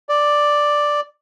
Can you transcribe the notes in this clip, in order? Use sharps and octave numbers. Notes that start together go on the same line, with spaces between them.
D5